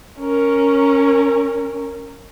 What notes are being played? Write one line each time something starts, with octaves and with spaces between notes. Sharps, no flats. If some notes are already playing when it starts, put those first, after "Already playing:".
C#4 A#4